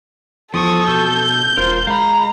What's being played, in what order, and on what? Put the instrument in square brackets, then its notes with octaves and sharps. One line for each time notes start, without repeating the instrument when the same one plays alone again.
[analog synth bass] E2 [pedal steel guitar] F3 [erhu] A4 [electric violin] C#6 D#6
[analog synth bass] B2 [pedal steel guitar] E6 [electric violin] G6
[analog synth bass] E1 [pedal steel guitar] F4 A#4 [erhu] C5
[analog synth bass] G#3 [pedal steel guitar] F5 B5 [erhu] A#5